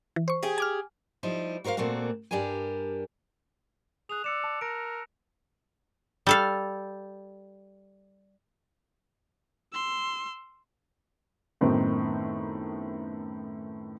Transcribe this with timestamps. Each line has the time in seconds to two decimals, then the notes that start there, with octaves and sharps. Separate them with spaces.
0.16 E3
0.28 C5 C#6
0.43 G4 G#4
0.58 G#5 D6 F6
1.23 F3 G3 D#4 E4
1.64 F#4 A#4 C5 D5 F5
1.77 A#2 A3 A#3 C4 F#4
2.31 G2 D4 G4 A#4 G#5
4.09 G#4 F#6 F7
4.24 D5 E6 C#7 E7
4.44 A5
4.61 A#4 A#6 D7
6.27 G3 A4 F5
9.73 C6 E6
11.61 F#2 A2 D#3 B3 C4 D#4